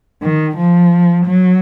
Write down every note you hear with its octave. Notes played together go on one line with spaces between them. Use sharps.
D#3
F3
F#3